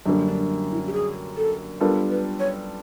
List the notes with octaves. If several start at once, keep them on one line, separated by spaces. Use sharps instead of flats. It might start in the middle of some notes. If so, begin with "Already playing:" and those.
F#2 D3 G3 A#3 D4
D4
E4
G4
G#4
A4
G3 B3 D4 F4 A4 A#4
B4
C#5